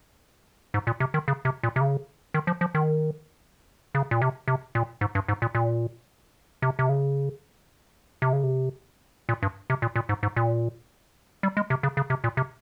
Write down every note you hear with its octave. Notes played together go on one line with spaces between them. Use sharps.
G#2
A#2
C3
D#3
C#3
C3
A#2
C3
C#3
D#3
F3
F3
D#3
C#3
A#2
C3
C3
A#2
G#2
G2
G#2
A#2
A#2
C3
C3
C#3
C3
C#3
C3
A#2
G2
C3
A#2
A#2
G#2
G#2
A#2
G3
G#3
C3
C#3
C#3
C3
A#2
C3